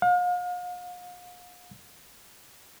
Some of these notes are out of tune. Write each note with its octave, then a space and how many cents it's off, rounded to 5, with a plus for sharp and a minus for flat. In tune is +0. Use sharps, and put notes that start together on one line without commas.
F5 +40